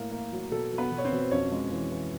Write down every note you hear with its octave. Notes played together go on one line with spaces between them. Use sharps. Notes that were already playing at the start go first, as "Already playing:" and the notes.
Already playing: A2 A#3
A#3
F#3
B2 A4
F#3
B3 B4
B2
C#5
C4 C5
B2
F2 C#4 C#5
G#3
E3
E3